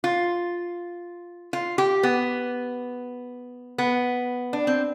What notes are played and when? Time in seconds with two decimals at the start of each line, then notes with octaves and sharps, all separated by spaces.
0.04 F4
1.53 F4
1.78 G4
2.03 B3
3.78 B3
4.53 D4
4.67 C4